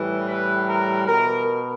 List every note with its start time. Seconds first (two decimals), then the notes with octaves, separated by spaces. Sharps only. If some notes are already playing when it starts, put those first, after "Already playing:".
Already playing: A2 E3 G3
0.28 B4
0.68 A#4
1.07 B2 A#4